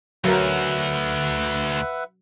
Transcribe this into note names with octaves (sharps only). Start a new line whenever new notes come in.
D2 F#3 A#4 B4 E5 F#5